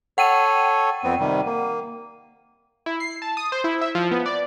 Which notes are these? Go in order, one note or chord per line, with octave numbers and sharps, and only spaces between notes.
A4 C#5 F#5 G5 D#7
F2 B3 C4
C3 D#3 G3
A#3
E4
C7
A5
D#6
C5
E4
E5
F3
B3
D5